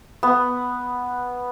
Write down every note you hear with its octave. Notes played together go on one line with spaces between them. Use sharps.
B3